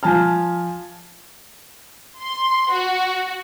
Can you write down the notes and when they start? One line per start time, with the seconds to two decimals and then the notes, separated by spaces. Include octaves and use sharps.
0.03 F3 G#5 A5 F6
2.21 C6
2.71 F#4